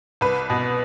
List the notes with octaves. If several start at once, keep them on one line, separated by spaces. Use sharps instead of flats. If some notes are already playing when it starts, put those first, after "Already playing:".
C2 B4
B2